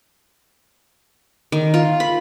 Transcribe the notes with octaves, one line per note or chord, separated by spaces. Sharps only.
D#3
F4
B5